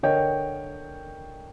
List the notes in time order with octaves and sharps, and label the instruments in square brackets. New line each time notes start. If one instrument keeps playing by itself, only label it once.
[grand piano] D3 A#4 C#5 D#5 G5